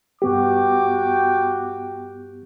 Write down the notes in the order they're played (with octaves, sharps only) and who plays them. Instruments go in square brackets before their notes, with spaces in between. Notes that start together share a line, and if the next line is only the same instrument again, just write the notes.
[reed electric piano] G2 B3 G4 [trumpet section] F#4 G5 D6